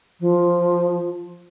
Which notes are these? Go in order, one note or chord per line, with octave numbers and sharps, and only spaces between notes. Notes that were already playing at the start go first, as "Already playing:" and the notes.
F3